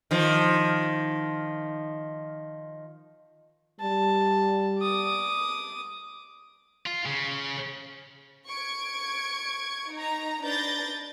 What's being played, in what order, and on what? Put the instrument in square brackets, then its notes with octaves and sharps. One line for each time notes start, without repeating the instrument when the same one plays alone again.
[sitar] D#3 F3
[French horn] G3 [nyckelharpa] A5
[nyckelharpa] D6 D#6
[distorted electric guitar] F4
C#3
[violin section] C#6 G#6 D7
D#4 A#5
D4 B4 G6 A6 A#6